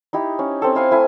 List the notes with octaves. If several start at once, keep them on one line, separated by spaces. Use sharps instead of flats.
D#4 E4 G4
C#4
C4 A4
E4 F5 G#5
A3 E4 G#5